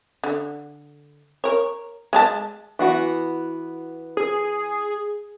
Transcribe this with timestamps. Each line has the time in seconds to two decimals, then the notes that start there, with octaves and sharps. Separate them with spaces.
0.24 D3
1.44 A#4 C#5
2.13 G#3 G#4 A5
2.79 E3 B3 F#4
4.17 G#4